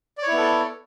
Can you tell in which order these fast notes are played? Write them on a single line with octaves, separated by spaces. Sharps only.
D5 C#5 E4 B3 A4